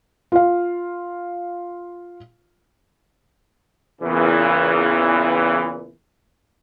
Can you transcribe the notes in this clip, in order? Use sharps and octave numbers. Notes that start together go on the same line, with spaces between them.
F4 F5
E2 A#2 C#3 E3